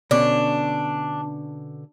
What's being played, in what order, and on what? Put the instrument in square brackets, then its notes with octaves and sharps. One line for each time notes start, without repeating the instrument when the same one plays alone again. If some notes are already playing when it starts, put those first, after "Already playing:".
[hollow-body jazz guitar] B2 D3 C#4 [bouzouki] D4